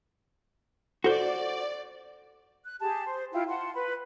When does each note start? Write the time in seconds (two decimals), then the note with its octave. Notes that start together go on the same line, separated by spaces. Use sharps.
1.04 F#4 A4 C5 D5
2.65 F#6
2.80 G4 G#4 A5
3.06 C5
3.33 E4 F4 F5 G5
3.48 F#5 A5 C6
3.74 B4 B5